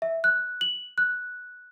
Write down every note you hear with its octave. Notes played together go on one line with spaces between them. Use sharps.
E5
F#6
F#7
F#6